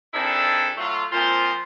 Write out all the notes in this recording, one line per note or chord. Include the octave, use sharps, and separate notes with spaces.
D#3 C4 D4 E4 G#4 A4
F#3 A3 F4
A#2 F3 C4 F4 C5 C6